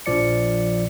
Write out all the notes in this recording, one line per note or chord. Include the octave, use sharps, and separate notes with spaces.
A#1 F3 D5 C#7